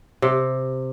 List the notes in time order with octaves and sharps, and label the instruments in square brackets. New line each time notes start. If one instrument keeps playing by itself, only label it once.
[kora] C3